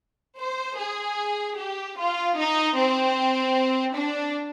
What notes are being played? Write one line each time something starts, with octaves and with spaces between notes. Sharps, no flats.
C5
G#4
G4
F4
D#4
C4
D4